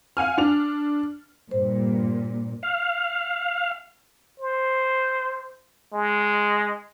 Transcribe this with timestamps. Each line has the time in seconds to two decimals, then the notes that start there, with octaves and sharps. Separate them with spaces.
0.17 F5 F#5 G#5 F6
0.38 D4 F7
1.51 G2 A#2 C5
2.63 F5
4.40 C5
5.94 G#3